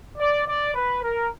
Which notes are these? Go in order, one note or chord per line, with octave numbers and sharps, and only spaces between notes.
D5
D5
B4
A#4